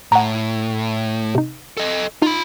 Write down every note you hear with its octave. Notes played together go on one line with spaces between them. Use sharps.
A2 F#5 A#5
C3 D#4
A4 D#5
D#4 F4 B5